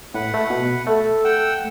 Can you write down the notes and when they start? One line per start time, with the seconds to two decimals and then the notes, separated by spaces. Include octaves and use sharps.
0.14 A2 B4 F#5
0.34 A3
0.50 B2
0.87 A3 A4
1.25 F#5 G5 E6